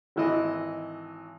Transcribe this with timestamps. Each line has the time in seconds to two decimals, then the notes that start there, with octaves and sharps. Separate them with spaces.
0.16 G#1 E3 D#5